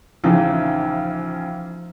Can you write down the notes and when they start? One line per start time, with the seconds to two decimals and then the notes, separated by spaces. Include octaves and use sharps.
0.24 A#1 C#3 E3 F3 A3 D#4